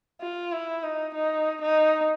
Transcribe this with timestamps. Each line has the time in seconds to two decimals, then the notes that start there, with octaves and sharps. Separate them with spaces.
0.21 F4
0.52 E4
0.83 D#4
1.14 D#4
1.62 D#4